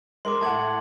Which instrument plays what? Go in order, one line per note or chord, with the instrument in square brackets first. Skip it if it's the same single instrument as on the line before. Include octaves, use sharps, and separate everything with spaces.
[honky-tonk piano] G#3 A#4 [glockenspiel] C6 D6
[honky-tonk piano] A2 F#5 [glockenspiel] A5 G#6 F#7